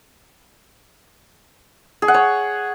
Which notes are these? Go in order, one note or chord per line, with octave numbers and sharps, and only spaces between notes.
G#4
F#5
C#5